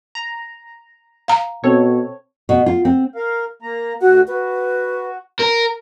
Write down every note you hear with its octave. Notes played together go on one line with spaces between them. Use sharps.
A#5
F5 A#5
B2 C4 A4 C#5
B2
F4
C4
A#4 F5
A#3 A#5
D2 F#4 F#5
F#4 B4
A#4